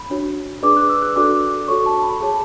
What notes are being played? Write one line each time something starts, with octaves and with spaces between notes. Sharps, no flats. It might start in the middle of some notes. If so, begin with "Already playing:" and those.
Already playing: B5
D4 F#4 C#5
D4 G#4 B4 D5 D6
F#6
E6
F#6
D4 F#4 A4 D5 D6
F#4 A4 C#5 C#6
A5
B5
G#4 C#5 A5